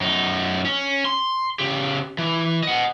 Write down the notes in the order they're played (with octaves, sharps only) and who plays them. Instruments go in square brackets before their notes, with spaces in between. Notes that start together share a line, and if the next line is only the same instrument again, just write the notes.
[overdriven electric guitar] F#2 D#4
C#4
C6
C#3 G4
E3
D#5 F#5